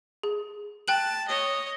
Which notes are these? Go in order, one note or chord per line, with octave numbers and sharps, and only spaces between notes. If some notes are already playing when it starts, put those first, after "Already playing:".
G#4
G5 A5 F#6 F#7
C#5 D#5